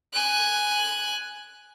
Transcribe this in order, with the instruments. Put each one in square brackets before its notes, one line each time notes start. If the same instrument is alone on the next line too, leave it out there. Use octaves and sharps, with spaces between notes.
[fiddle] G#5 F#6